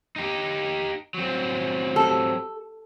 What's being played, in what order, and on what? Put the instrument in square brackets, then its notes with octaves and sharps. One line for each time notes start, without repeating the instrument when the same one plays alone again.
[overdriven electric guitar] D#4 G4
F#3 C4
[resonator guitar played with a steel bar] A4